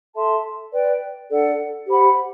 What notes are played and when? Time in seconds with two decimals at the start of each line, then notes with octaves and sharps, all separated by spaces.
0.15 A4 E5 A5 C6
0.72 B4 D5 G5
1.30 D4 A4 D5 F#5
1.87 G4 C5 F#5 B5